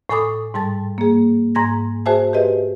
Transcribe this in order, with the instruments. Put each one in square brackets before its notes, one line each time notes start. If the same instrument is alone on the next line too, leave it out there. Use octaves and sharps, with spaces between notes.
[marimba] A2 A4 G#5 B5 D6 D#6
G#2 G3 A5 A6
A#3 G#4
G#2 G#5 A#5 G#6 A#6
F#4 G#4 C5 E5 G#5 A5
G4 G#4 B4 D#5 E5